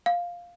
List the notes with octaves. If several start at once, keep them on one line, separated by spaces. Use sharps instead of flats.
F5